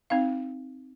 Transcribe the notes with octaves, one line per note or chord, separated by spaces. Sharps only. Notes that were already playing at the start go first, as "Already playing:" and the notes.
C4 D#4 F5